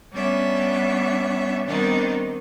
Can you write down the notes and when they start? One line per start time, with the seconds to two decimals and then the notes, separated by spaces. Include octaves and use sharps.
0.12 G3 B3 C#4 D4 E5
1.65 D#3 G3 B3 C4 D4 D#4